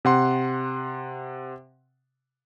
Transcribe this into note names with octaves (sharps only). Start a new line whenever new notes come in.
C3 F#5 C6